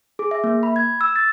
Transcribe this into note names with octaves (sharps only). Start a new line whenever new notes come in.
G#4
E5
A#3
B5
G#6
E6
A6